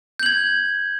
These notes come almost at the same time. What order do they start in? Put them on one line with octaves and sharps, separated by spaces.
G6 F#7 G#6